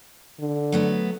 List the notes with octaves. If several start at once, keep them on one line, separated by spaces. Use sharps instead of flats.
D3
F#3 A3 B3